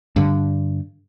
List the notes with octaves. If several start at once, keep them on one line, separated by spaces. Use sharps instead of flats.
G2 D3